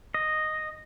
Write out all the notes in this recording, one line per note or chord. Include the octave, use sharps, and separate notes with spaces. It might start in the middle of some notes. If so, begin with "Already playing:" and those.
D#5